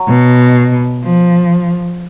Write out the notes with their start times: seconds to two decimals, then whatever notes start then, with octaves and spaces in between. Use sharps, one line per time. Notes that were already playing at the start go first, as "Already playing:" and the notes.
Already playing: F#3
0.08 B2
1.04 F3